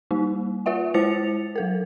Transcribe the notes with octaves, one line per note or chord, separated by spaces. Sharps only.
G3 A#3 D#4
F4 B4 E5 F#5
G#3 E4 C5 A6 C#7 F7
F#3 A4 A#4